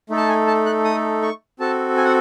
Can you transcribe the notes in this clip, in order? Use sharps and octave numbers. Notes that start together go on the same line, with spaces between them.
A3 D#4 A4
A5
G#5
A5
F#6
D#6
C#6
C4 F#4 A4 A5
G#5
F#5